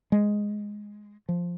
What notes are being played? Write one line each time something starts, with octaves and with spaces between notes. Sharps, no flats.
G#3
F3